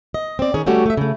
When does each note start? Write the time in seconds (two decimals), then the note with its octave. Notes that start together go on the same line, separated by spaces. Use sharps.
0.14 D#5
0.39 C4 D5
0.54 D#3 C#4 G#4
0.66 G3 A3 C#4 F#4 G4
0.86 A3 E5
0.97 C#3 A3